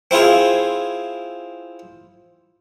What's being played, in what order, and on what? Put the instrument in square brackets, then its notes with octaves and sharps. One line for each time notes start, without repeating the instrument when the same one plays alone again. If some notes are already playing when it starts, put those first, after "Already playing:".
[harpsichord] C4 E4 F4 G#4